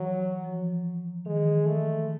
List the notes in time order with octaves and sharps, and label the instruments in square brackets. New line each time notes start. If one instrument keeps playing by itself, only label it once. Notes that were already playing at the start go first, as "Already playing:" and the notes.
Already playing: [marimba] E3 [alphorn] F#3
[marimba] F3
[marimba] D#3 [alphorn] G#3
[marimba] E3
D#3
[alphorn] A3